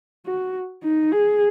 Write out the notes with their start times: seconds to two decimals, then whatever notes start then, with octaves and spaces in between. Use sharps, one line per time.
0.26 F#4
0.83 D#4
1.12 G#4